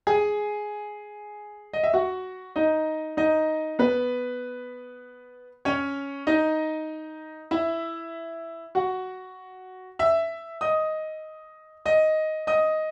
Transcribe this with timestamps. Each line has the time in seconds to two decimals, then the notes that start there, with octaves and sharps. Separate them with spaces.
0.07 G#4 G#5
1.73 D#5
1.84 E5
1.94 F#4 F#5
2.56 D#4 D#5
3.17 D#4 D#5
3.79 B3 B4
5.65 C#4 C#5
6.27 D#4 D#5
7.51 E4 E5
8.75 F#4 F#5
9.99 E5 E6
10.61 D#5 D#6
11.86 D#5 D#6
12.47 D#5 D#6